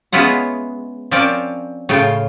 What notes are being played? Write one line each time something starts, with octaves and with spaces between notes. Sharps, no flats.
G#3 B3 C#4 E4 F4 F#5
F3 C4 C#4 A#4 D5 A5
A2 C#3 F4 G5